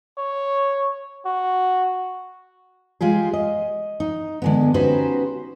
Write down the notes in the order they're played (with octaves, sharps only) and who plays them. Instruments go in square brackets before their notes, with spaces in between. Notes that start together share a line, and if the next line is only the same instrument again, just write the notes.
[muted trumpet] C#5
F#4
[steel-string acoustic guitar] G#3 F4 G4 G#4
D#5
D#4
D3 G#3 B3
C#4 D#4 F#4 G4 B4 C5